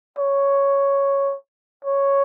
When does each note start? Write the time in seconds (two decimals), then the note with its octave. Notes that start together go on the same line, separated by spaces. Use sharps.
0.19 C#5
1.85 C#5